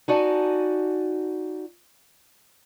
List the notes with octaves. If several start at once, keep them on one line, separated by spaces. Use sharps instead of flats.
D#4 F#4 D5 G#5 A5